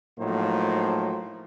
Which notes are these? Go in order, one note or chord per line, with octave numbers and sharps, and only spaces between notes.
A2 F3 F#3 A#3 D#4 C5